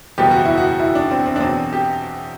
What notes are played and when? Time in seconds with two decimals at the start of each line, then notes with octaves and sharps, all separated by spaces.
0.18 F#1 E2 B2 G3 G4
0.31 F#4
0.45 E4
0.58 F#4
0.80 E4
0.95 D4
1.11 C4
1.26 C4
1.36 D4
1.41 E2 B2 F#3 C4
1.73 G4